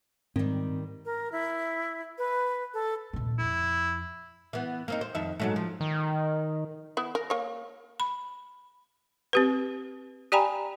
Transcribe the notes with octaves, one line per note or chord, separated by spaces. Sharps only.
G#2 D#3 G3 C4
A#4
E4
B4
A4
D#1 C3
F2 E4
E3 B3
A#3 C4 D#4
C5
F2 D#3 E5
G#2 F#3 A3
F3
D#3
B3 E4
A#4
A#3 C#5
B5
C4 G4 B4
G4 D5 G5 G#5 A#5 B5